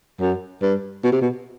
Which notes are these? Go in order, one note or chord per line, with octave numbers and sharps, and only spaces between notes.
F#2
G2
B2
C3
B2